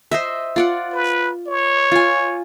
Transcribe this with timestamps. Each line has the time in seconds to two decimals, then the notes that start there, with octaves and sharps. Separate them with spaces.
0.11 C5 D#5 E5
0.56 F4 D5 F#5
0.92 B4
1.47 C#5
1.92 F4 G#5